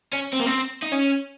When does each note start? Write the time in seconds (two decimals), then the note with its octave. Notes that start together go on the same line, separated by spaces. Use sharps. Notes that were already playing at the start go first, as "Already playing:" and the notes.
0.13 C#4
0.33 C4
0.40 A#3
0.46 C4
0.83 D#4
0.92 C#4